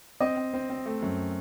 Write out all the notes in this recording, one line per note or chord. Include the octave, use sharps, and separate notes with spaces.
C4 D#5
C4
C4
C4
A3
F#2